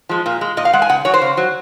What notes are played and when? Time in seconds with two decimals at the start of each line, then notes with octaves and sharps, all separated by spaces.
0.09 F3 G#3
0.26 A#2
0.41 G#3
0.57 A#2 D#5
0.65 F5
0.73 G#3 F#5
0.82 G#5
0.89 C#3 F#5
1.05 F#3 C#5
1.14 C5
1.21 C#3
1.37 F#3